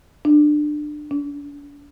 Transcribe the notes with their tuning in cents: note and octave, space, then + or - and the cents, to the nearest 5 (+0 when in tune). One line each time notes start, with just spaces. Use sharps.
D4 +25
D4 -40